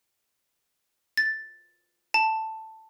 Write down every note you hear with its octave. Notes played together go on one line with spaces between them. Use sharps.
A6
A5